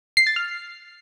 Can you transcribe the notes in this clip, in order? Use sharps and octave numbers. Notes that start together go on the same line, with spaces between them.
C7
A6
F6